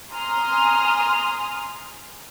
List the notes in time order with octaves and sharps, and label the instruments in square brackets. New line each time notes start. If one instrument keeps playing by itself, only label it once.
[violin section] G#5 A#5 C6 D#6 F6